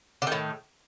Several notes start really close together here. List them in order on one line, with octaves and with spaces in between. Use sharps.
D3 D#3 A2